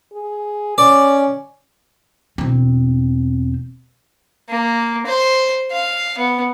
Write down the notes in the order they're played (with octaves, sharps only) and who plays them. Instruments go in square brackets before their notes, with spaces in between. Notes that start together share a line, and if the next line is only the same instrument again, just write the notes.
[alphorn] G#4
[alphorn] C#4 [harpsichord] D5
[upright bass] E1 C4
[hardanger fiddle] A#3
C5
F5
B3